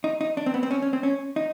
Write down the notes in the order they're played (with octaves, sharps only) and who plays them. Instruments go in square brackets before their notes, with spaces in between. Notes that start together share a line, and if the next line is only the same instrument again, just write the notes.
[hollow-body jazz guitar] D#4
D#4
D4
C4
B3
C4
C#4
C#4
C4
C#4
D#4